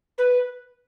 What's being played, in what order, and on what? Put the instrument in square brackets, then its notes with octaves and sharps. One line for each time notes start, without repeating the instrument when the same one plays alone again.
[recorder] B4